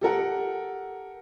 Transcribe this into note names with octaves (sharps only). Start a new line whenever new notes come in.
G4 A4 A#4 F#5